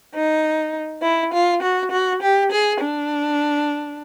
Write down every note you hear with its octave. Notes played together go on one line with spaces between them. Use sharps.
D#4
E4
F4
F#4
F#4
G4
G#4
D4